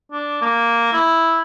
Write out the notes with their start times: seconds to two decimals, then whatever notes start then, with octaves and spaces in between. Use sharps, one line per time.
0.12 D4
0.42 A#3
0.93 E4